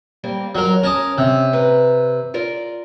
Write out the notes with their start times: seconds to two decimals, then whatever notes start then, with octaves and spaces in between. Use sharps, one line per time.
0.24 G3 A#3 C4
0.55 F2 F#3 A#4
0.83 C#4 A#4 A5 D#6
1.18 C3
1.53 B4 A#5
2.34 F4 A#4 D5